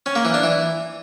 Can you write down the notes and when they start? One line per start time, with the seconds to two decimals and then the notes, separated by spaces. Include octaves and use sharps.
0.06 C#4
0.15 A#3
0.25 E3
0.34 D4
0.43 E3